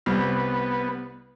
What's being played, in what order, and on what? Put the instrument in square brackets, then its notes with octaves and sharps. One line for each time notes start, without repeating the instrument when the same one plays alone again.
[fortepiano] C2 [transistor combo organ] B3